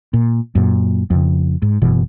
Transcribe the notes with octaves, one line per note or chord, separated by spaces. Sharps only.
A#2
F#2 A#2
F2 C#3
G#2
F#1 B2 E3